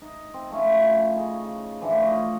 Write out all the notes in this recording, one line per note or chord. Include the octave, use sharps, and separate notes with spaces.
D#4
C4
F3 A3 C#4 E4
C#3 D#4
A2 D3 E3 F3
C#5 D#5 F5